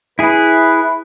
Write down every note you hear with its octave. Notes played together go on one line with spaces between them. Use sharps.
E4 G#4 B4